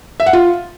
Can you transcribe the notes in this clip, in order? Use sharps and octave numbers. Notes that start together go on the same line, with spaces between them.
E5
F#5
F4